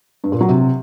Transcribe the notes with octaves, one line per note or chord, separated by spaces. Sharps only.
G2
A#2
F#3
C3